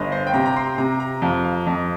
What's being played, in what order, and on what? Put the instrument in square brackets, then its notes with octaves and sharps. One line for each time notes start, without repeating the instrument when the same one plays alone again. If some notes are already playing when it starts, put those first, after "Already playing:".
Already playing: [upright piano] G1 [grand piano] D#5 F5
[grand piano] C5
G5
[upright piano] C3 [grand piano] A#5
[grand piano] A#5
C6
[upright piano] C3 [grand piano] A#5
[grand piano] A#5
[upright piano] F2 [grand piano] F5
[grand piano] F5
[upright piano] F2 [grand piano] D#5